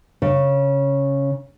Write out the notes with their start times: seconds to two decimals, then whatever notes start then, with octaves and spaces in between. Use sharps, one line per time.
0.22 C#3